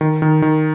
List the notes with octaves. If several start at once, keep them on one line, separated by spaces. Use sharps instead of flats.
D#3
D#3
D#3